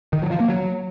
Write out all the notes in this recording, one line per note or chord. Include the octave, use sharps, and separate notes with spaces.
D#3
F#3
F3
A#3
F#3